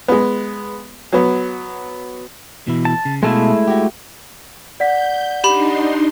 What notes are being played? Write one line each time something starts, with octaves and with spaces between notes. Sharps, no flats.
G#3 B3
F#3 B3
B2 E3 E4
A5
C#3
B2 G#3 A3 E4 F5 A5
F#4 G4
D5 F#5 G6 B6
D4 D#4 G4 B5 C6